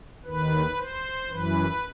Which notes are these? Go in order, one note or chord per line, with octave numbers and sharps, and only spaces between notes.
D#2 D#3 B4
C5
F#2 E3 B4